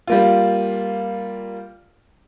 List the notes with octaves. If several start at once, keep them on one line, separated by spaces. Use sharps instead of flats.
G3 A#3 F4